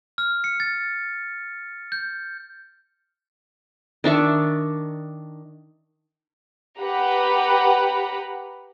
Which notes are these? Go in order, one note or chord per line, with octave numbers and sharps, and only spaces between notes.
F6
C#7
A6
G6
D#3 D4 E5 C#6
G4 B4 F#5 A#5 B5